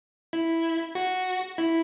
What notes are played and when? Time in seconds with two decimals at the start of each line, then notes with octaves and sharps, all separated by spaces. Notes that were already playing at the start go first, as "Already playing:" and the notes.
0.33 E4
0.95 F#4
1.58 E4